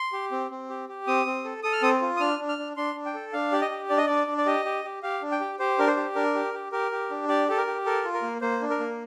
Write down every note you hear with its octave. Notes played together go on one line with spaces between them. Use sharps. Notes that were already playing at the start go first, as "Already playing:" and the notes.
Already playing: C6
G4
C4
C4
G4
G4
C4 D#6
C4
A4
A4 D#6
F6
C4 D#6
F4
D#6
D4 F6
D4
F6
D4
D4 C6
D4
G5
A4
D4 F5
G4 D5
D#5
G4
D4 D5
D#5
D4 D5
D4
D5
G4 D#5
G4
G4
G4 F5
D4
G5
G4
G4 C5
D4 A#4
C5
G4
D4 A#4
G4
G4
G4 A#4
G4
D4
G4 D5
G4 A4
A#4
G4
A4 A#4
F4
A#4
A#3
A#3 C5
D4
A#4
A#3